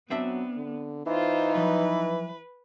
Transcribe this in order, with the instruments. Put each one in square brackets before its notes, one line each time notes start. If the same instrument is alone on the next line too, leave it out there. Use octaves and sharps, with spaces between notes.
[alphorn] F#3 [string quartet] B3 [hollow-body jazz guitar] C4 D4 E5
[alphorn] D3
[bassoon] E3 [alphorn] D#4 [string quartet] F4 C5
[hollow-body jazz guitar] F3 F#3 [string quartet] B4